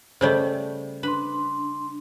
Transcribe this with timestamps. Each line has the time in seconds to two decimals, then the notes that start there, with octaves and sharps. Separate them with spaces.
0.21 C#3 G3 A3 C5 C#5 D#5
1.03 D4 B4 C6